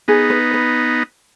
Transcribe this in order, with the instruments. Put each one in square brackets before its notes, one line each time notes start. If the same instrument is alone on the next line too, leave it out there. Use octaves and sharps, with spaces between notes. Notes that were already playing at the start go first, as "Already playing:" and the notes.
[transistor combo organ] B3 D#4 [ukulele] G#4
[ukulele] B4
B4